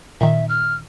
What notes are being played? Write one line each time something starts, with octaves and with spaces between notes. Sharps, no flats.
A#2 D#3 E5
F6